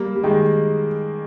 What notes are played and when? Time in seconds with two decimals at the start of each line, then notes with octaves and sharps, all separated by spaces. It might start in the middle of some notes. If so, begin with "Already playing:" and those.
Already playing: G3 A#3
0.16 G3
0.23 D#3 G#3